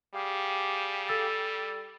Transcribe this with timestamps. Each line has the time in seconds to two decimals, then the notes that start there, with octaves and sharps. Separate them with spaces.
0.14 G3 G4 G#4 F5
1.08 A4 E6 A6